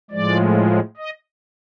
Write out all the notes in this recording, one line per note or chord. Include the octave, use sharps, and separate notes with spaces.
A2 F3 G#3 D5
D#5